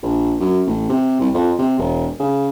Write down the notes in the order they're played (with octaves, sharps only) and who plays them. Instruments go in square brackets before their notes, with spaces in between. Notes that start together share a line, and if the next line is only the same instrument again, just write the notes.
[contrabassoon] A#1
F#2
A1
C3
C2
F2
C3
E1
C#3